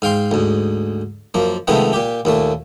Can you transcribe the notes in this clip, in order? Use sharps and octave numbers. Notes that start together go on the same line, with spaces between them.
G#2 F5 G5 C6
D2 G#2
F#2 F3 A#3
C3 D#3 F3 G#3 A3 B3
A#2 G4
D#2 A#2 A3